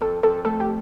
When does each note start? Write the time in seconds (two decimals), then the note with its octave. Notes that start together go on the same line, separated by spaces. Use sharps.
0.01 F2 A4
0.23 F2 A4
0.45 A3 A4
0.60 G4